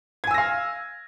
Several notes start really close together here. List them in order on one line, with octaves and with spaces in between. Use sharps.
G#6 G#5 E6 A#6 F5